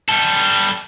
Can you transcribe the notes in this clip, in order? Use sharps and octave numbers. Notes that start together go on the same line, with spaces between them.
G3 A4